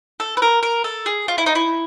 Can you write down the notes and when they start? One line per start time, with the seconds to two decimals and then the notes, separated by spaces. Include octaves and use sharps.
0.20 A4
0.37 B4
0.42 A#4
0.63 A#4
0.84 A4
1.06 G#4
1.28 F4
1.38 E4
1.46 D#4
1.55 E4